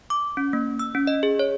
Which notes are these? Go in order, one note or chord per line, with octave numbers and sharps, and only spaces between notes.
D6
C#4
A#3
E6
C#4
D#5
G#4
C#5